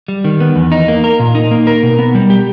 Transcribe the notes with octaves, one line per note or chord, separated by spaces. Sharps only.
G3
D#3
B3
E2
D#4
A#3
A#4
A#2
D#4
A#3
A#4
B2
B3
G3
G4